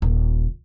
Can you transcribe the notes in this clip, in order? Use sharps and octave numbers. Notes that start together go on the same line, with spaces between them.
D#1